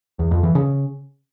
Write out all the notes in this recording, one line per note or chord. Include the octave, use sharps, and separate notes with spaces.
E2
F2
E3
C#3